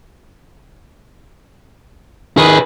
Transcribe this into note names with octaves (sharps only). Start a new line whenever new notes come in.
D#3 G#4 B4